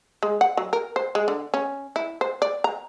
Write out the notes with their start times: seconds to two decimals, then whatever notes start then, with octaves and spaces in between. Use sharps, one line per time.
0.23 G#3
0.41 F#5
0.57 F#3
0.73 A#4
0.96 C5
1.15 G#3
1.28 D3
1.54 C#4
1.96 E4
2.21 C5
2.42 D5
2.64 A#5